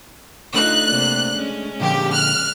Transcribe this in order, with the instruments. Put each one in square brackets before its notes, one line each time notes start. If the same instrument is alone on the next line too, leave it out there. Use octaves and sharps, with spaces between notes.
[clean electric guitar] A3 D4 [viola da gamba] D#4 F4 [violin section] F#6
[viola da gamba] C3 A#3 D5
G#3 C#4
[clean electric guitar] A#2 D3 F3 [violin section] G4
[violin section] F6 F#6